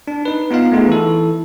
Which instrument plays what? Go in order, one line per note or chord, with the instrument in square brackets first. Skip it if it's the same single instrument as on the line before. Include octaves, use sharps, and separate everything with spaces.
[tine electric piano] D4
D#4 B4
B3 D#4 F4 F5
A3 B3 D#4 F4 G#4
E3 E4 A4